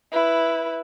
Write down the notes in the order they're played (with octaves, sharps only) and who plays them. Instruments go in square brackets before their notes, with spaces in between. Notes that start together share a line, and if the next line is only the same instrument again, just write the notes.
[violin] E4 B4